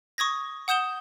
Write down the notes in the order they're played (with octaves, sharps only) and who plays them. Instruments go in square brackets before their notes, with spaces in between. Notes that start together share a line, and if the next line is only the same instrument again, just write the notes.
[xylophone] C#6 D#6 G#6 A#6
F#5 D#6 G6 E7 G7